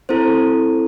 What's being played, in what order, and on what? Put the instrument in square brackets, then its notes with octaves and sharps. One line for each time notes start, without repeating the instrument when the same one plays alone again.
[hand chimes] C4 E4 A4 C5